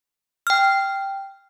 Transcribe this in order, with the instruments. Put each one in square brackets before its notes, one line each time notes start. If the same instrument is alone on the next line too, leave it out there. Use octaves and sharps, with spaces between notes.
[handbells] G5 F6